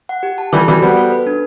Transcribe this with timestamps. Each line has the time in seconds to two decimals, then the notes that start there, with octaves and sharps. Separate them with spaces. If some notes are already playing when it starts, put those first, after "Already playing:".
0.09 F#5
0.23 G4
0.38 A5
0.53 E3 G3 A4
0.68 E3 G3 F#4
0.82 G3 B3 C5
0.97 A4
1.12 B4
1.27 D4